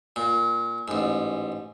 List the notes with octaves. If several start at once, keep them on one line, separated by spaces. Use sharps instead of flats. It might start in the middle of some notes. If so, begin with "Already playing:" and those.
A#2
A1 G#2